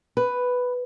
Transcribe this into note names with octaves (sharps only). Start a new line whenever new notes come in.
B4